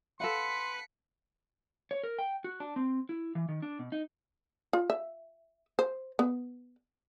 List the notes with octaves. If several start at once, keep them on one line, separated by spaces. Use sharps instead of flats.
A4 B4 F5 F#5 C6 B6 C#7
C#5
A#4
G5
F#4
D4
C4
E4
E3
D#3
D4
B2
D#4
F4
E5
C5
B3